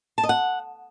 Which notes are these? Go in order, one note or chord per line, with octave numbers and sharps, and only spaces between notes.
A5
D#5
F#5